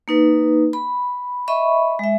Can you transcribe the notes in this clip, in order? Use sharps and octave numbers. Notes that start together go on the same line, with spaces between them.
A#3 D#4 B4
B5
D#5 E5 B5 C#6
G#3 E5